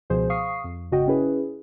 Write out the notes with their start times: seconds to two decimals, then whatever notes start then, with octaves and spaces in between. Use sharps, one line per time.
0.10 C#2 B2 F3 G#4 C5
0.30 F5 C#6 D#6 C7
0.64 F2
0.91 G#1 C#3 F#4 D#5 G5
1.08 C#4 E4 G#4 B4